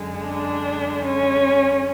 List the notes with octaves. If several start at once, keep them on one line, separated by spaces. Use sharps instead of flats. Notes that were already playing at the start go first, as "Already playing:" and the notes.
Already playing: F#2 D3 G#3
D4
C#4